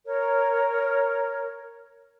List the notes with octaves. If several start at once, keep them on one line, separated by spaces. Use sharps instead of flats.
A#4 C#5